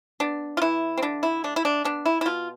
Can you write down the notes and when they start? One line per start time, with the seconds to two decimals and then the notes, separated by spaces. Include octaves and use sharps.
0.20 B3 D4
0.57 F4
0.62 E3 E4
0.98 C4
1.02 D3 D4
1.23 E4
1.44 A3 D4
1.56 E4
1.65 D4
1.84 B3 D4
2.06 E4
2.21 E4
2.25 B2 F4